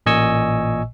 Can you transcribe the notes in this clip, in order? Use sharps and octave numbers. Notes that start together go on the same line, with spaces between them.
A1 A#2 D#5 G#5 C#6 E6